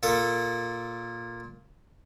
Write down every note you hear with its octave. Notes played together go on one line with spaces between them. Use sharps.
A#2 A#3 A4 D#6